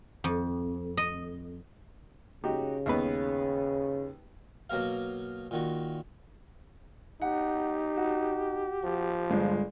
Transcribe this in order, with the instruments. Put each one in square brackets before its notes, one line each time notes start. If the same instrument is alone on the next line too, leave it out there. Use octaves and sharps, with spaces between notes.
[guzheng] F2
D#5
[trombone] C#3 [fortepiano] D#4 F#4 G4
[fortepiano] D#2 B3 B4
[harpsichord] B2 F#3 A#3 A#4 F5
A#2 D#3 F#4
[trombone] D#4 [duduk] G4 [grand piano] F#5
[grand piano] F#4
[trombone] F3
[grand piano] G1 G#3